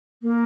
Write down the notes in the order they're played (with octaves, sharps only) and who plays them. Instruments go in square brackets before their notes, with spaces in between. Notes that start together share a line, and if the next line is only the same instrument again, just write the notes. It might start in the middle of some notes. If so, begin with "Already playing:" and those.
[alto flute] A#3